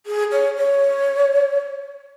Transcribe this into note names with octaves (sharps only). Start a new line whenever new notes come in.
G#4
C#5
C#5